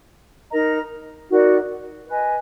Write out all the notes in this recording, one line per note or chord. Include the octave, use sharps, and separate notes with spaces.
D#4 A#4 D#5 A#5
D#4 F#4 A#4 D5
B4 D#5 G#5